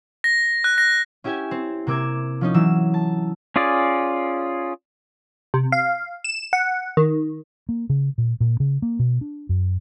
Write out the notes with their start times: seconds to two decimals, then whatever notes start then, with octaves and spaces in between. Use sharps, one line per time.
0.24 A#6
0.64 F#6
0.78 A#6
1.24 C#4 E4 G4 E5 G#5
1.51 C4
1.87 C3 A#3 D6 E6 G#6
2.41 F3 C#4 D#4
2.54 E3 F#3 E6
2.94 A5
3.56 C#4 F4 G#4 D5
5.54 C3
5.72 F5
6.24 E7
6.53 F#5
6.97 D#3
7.69 A#3
7.89 C#3
8.18 A#2
8.40 A#2
8.60 C#3
8.82 A#3
8.99 B2
9.21 D4
9.49 F#2